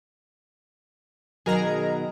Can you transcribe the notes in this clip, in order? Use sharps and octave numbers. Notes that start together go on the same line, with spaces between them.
B2 D#3 F#3 G#4 A#4 A#5